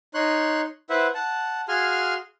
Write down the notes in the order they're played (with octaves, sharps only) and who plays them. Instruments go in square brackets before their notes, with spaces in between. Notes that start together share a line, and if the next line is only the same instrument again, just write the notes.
[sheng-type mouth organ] D#4 C#5 C6 F#6
E4 B4 C5 E5 F#5
F#5 A5
F#4 G#4 F5 G#5 C6 F6